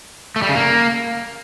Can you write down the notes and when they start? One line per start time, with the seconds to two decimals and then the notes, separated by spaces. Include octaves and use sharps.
0.36 A3
0.42 G3
0.49 C#3
0.55 A#3